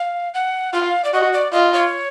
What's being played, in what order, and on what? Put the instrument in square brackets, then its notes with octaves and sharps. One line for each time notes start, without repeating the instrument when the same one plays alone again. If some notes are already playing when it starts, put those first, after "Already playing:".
Already playing: [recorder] F5
F#5
[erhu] F4 [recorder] F5
[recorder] D5
[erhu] F#4 [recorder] D#5
[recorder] D5
[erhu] F4 [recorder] D#5
[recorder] C#5